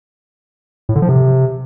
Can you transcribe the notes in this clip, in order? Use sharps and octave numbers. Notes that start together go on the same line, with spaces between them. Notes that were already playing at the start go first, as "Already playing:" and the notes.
A2
D3
F3
C3